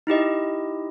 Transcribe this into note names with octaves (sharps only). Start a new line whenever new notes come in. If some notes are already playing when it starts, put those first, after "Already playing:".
D#4 E4 G4 D#5